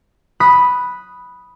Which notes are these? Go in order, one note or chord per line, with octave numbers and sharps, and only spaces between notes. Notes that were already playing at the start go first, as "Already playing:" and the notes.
B5 D#6 F#6 B6